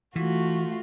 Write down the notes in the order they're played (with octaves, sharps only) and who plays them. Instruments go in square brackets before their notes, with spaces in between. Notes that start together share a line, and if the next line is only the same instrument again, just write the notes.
[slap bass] E3 [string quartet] A3 F4 F#4